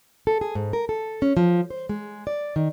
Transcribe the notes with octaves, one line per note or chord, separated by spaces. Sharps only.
A4
G#4
G#2
A#4
A4
C#4
F3
C5
G#3
D5
D#3